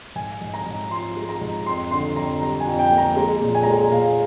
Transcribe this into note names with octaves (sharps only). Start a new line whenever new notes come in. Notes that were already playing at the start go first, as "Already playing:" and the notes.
G#2 G#5
G#2
A#5
G#2
F3 C6
G#3
A#5
G#2
F2 C6
D3 C6
F2 A#5
G3 A#5
G#5
F2
G5
A#3
A#5
G#3 A#5
A#2
G#5
G#3 A#5
G#5
A#2 F5